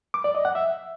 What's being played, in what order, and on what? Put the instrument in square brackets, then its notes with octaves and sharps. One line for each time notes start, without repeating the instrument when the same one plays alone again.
[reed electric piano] D6
D5
D#5
F#5
E5